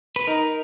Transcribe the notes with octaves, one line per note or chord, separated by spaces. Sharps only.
B4
D#4 A#4